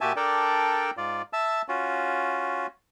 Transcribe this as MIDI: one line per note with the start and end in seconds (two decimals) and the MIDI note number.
0.01 0.13 46
0.01 0.13 66
0.01 0.13 67
0.01 0.13 76
0.01 0.13 80
0.01 0.13 81
0.16 0.91 62
0.16 0.91 69
0.16 0.91 70
0.16 0.91 74
0.16 0.91 79
0.97 1.22 44
0.97 1.22 65
0.97 1.22 74
1.33 1.62 76
1.33 1.62 81
1.33 1.62 88
1.69 2.67 61
1.69 2.67 65
1.69 2.67 66